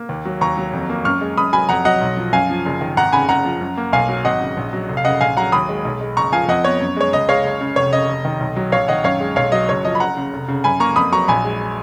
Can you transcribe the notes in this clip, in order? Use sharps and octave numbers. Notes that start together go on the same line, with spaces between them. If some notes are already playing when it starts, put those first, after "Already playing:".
Already playing: A#3
D#2
F#3
D#2 A#5 C#6
F#3
F2
A#3
F#2 C#6 F6
G#3
F#2 B5 D#6
F#3 G#5 B5
F2 F#5 A#5
F#3 D#5 F#5
B1
F3
F#2 F5 G#5
F3
F#1
D#3
G#1 F#5 A#5
C#3 G#5 B5
F#1 F#5 A#5
F3
F#2
A#3
B1 F5 G#5
F#3
G#1 D#5 F#5
C#3
A#1
F#3
F1
F5
C#3 D#5 F#5
A#1 F5 G#5
F#3 F#5 A#5
D#2 B5 D#6
G#3
B1
G#3
F#1 A#5 C#6
F3 F5 G#5
F2 D#5 F#5
B3 C#5
F#2
G#3 C#5
C#2 D#5
G#3 C#5 F5
F#1
C#3
F1 C#5
C#3 D#5
F1
D#3
B1
F#3
A#1 C#5 F5
D#3 D#5 F#5
F#2 C#5 F5
G#3
B1 C#5 F5
F#3 D#5
F#1 C#5
F3 D#5
B5
F#1 F#5 A#5
C#3
F1
C#3
F#2 G#5 B5
A#3 A#5 C#6
F2 B5 D#6
F#3 A#5 C#6
A#1 G#5 B5
G#3